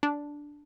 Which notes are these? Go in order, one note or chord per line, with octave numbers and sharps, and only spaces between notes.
D4